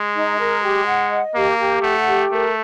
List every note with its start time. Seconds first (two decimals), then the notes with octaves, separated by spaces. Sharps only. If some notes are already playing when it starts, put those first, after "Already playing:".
Already playing: G#3
0.14 D#4
0.38 A#4
0.63 G4
0.86 F#5
1.10 D#5
1.35 A#3 G4
1.59 G4
1.82 A3 F#5
2.06 G4
2.31 A3 A#4